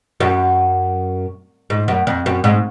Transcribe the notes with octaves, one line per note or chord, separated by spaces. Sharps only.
F#2
G#2
F#2
F2
F#2
G#2